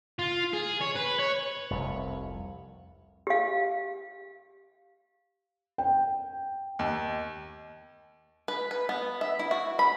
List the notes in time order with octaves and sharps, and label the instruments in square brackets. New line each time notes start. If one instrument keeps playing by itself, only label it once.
[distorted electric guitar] F4
G#4
C#5
B4
C#5
[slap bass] F1 C2 F2
[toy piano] G4 F5
[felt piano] G5
[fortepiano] D#2
[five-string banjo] B4
B4
B3
E5
E4
F#4
B5